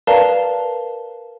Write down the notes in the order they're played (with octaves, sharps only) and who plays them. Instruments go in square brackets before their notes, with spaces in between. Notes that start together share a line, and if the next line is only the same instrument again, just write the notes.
[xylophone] A#4 B4 D5 F5 A5 A#5